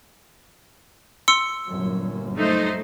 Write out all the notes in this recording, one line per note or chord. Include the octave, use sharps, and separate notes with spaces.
C6 E6 C#7
G1 F#2 A#2
A3 D#4 C5